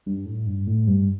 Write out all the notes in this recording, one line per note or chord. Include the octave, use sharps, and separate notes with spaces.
G2
A2
G2
A2
G2